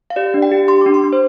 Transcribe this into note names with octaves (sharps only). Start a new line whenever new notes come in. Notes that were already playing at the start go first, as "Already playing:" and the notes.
F5
G4 D5
D4
G5
G4
G4 C6
D4 D6
C6
D4
C5